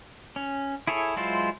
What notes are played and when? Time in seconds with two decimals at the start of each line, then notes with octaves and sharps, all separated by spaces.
0.36 C#4
0.87 E4 G#4 A4 C#5
1.16 F#3 G#3 E4 F4 C5